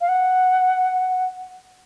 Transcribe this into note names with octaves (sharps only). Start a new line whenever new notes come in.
F5
F#5